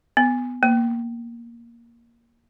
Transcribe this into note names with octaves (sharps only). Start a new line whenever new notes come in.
B3
A#3